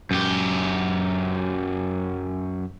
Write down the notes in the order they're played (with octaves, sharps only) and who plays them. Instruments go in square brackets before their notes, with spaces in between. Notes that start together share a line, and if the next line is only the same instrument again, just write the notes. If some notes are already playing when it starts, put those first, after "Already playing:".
[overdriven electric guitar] F#2 G4